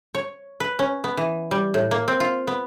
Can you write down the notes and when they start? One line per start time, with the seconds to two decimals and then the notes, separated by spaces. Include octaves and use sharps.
0.15 C#5
0.60 B4
0.79 C#4
1.04 B3
1.17 E3
1.51 G3
1.74 A2
1.91 A#3
2.08 C4
2.20 F4
2.47 B3